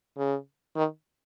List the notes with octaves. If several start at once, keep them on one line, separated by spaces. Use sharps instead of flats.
C#3
D#3